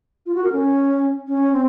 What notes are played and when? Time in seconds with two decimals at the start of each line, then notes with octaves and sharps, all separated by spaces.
0.26 F4
0.35 F#4
0.44 A#4
0.52 C#4
1.28 C#4
1.53 C4